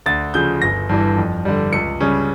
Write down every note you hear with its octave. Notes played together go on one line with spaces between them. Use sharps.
D2 A6
C#3 F3 G6
G1 A#6
G2 E3 G3
F2
D3 G3
C#2 C#7
C#3 G3 C#4